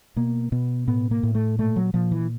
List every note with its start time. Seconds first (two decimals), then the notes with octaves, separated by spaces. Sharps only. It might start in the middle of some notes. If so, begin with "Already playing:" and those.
0.16 B2 A#3
0.52 B2 B3
0.87 A2 B3
1.11 A#3
1.23 A2
1.35 A3
1.58 A#2 A3
1.76 F#3
1.94 A#2 F3
2.11 E3